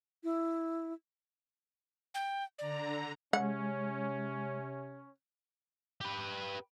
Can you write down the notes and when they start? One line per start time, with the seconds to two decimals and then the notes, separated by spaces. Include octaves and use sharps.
0.24 E4
2.14 G5
2.58 D3 D5 A#5
3.33 C3 G#3 C#4 F#5
6.01 G4 B4